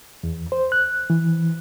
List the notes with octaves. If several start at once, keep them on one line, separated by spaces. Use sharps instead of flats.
E2
C5
F#6
E3